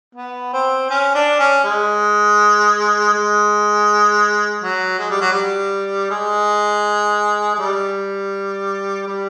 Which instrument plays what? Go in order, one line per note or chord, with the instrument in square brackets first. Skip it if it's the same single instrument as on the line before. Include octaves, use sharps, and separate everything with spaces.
[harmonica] B3
C4
C#4
D4
C#4
G#3
G#3
F#3
G#3
G3
F#3
G3
G#3
G#3
G3
G3